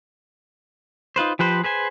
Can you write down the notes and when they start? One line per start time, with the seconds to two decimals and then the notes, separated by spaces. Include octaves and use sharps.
1.16 D#4 F4 B4 C5
1.39 F3 G4 B4 C5
1.63 G#4 B4 C5 G#5